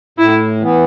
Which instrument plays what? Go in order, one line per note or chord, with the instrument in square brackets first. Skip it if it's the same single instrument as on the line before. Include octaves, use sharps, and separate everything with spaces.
[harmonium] A2 [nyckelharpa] E4
[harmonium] E3 B3